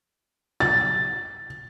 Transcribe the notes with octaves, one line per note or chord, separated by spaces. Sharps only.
A6